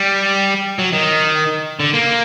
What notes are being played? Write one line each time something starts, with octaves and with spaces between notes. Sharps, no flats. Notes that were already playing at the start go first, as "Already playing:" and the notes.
Already playing: G3
F#3
D#3
D3
A#3